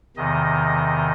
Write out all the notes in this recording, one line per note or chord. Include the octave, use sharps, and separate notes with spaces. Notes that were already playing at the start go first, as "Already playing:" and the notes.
E2 C3 D#3 D#5